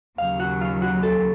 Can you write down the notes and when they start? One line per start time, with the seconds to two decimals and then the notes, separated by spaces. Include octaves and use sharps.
0.18 D#2 C#3 F#3 F5
0.40 F#4
0.61 F4
0.82 F#4
1.03 A4